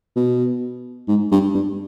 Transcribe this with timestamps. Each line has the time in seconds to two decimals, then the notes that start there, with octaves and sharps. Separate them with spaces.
0.16 B2
1.08 G#2
1.32 G2
1.55 G2